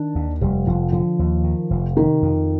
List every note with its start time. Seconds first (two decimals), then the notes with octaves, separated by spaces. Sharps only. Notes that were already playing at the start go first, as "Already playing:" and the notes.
Already playing: D#3 D4
0.15 D#2
0.41 F1 G3
0.67 F1 F3
0.92 D3 F3
1.19 D#2
1.44 D#3
1.70 F1
1.97 C3 D#3
2.22 F2